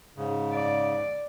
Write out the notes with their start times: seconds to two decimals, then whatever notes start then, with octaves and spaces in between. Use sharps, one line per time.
0.17 G#2 C#3
0.53 D5